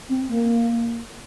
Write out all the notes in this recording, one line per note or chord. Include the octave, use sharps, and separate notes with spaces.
C4
A#3